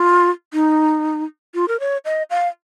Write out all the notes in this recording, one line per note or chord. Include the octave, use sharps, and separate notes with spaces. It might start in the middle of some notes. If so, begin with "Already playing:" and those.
Already playing: F4
D#4
F4
A#4
C#5
D#5
F5